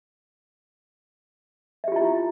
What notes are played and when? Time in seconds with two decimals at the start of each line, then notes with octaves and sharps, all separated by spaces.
1.84 E5
1.88 G4
1.92 F4
1.96 E4